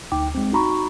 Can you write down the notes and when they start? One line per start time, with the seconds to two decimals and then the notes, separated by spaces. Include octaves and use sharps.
0.12 D2 D#4 G5 D6
0.35 G#3 C4
0.53 D#4 F#4 A#5 B5 C#6